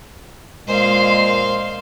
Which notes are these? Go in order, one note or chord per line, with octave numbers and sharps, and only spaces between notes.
A#2 G#3 C5 F5